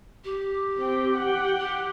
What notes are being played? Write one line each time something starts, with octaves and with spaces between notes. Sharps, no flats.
G4
C4 G5
F#5 G5
G4